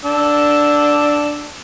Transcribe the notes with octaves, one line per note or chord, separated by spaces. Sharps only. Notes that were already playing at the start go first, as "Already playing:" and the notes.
D4 E6